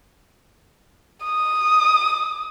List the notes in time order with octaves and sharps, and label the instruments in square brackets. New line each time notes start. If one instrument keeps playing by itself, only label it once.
[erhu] D#6